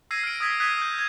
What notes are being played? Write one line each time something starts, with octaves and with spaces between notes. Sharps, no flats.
E6 G#6 A#6 C7 D#7
F6 D7
D#6 E6 G#6 B6
D#6 F#6 G#6 B6 D#7 E7
D#6 G6
G6 G#6